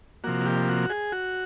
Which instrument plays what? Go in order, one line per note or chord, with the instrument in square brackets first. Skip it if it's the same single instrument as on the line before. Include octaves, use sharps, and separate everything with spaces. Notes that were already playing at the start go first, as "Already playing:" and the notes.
[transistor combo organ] C3 F3 A#3 F#4
G4
F#4
G#4
F#4